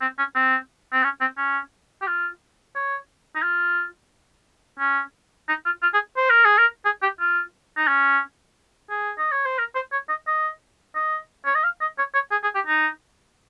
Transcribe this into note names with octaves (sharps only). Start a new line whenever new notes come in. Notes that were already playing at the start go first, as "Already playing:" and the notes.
C4
C#4
C4
C4
C#4
C4
C#4
G4
F4
C#5
D#4
F4
C#4
D#4
F4
F4
G#4
C5
A#4
G#4
A#4
G#4
G4
F4
D#4
C#4
G#4
D#5
C#5
C5
A#4
C5
C#5
D#5
D#5
D#5
C#5
D#5
F5
D#5
C#5
C#5
G#4
G#4
G4
D#4